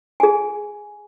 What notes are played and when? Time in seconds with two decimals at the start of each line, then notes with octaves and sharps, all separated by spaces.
0.20 G#4 G#5